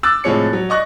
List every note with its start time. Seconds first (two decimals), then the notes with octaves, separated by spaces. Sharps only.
0.03 D6 E6 F#6 A6
0.24 A2 C3 F3 G#3 C#5 C#7
0.53 F#3
0.69 D5 D#5 C#6 F#6 A#6